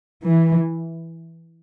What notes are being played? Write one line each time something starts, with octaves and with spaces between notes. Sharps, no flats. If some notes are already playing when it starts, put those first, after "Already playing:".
E3